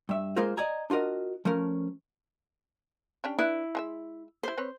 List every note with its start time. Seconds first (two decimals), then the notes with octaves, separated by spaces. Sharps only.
0.09 G2 E5
0.36 G#3 A#3 F4 G#4 A#4 C5
0.57 D5 D#5 G#5 A#5
0.90 D4 F4 F#4 A#4 D#5
1.45 F3 A3 C#4 A#4
3.24 C#4 D4 G4
3.39 D4 E4 B4 D5
3.75 G#3 G#4 E5
4.43 G3 E4 C5
4.58 C4 B4 C#5